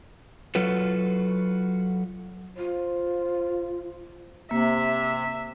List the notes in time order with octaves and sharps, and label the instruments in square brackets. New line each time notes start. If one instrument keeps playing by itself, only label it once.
[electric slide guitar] F#3 F4 F#4 A4 B4
[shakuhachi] F4 [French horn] C5
[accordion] C3 [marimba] A#3 [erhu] E5